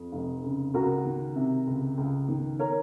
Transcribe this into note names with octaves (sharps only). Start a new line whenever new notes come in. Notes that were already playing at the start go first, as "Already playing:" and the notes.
Already playing: F2
F1
C#3
C#2 F#4 A#4
D#3
C3
C#2
C#2
D#3
A#4 C#5